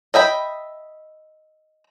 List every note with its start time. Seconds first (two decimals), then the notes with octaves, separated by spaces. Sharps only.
0.14 D#5 E5 G5 B5